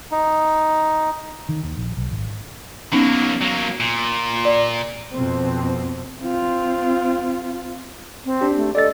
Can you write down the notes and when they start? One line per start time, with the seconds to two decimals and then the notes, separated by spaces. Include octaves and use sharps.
0.11 D#4
1.49 D#3
1.63 D#2
1.77 A#1
1.97 B1
2.11 G#1
2.92 F#3 A#3 B3 C#4 D#4
3.41 F#3 A#3
3.80 A#2
4.45 D5
5.12 F2 B2 C4
6.20 C4 F4
8.25 C4
8.41 D4 G4
8.57 A3
8.75 A4 D5 D#5 A6